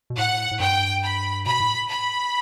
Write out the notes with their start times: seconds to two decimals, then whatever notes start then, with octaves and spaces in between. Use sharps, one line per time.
0.10 B2
0.17 A2 F#5
0.51 A2
0.60 G2 G5
1.03 B5
1.46 B2 B5
1.60 A2
1.89 B5